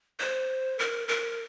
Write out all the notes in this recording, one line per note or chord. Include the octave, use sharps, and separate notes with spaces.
C5
A#4
A#4